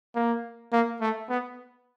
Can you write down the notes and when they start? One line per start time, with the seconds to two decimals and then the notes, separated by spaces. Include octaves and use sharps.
0.15 A#3
0.73 A#3
1.01 A3
1.29 B3